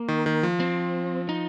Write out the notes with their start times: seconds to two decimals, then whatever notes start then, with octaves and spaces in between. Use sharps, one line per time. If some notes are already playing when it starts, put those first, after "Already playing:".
Already playing: A#3
0.08 D#3
0.26 D#3
0.43 F3
0.60 C4
1.29 D#4